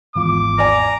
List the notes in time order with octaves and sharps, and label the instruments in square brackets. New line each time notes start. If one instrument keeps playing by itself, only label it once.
[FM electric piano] G#1 E2 F4 [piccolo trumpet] D6
[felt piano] D5 G#5 [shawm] A#5